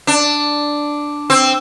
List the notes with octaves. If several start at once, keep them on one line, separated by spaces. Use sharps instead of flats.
D4
C4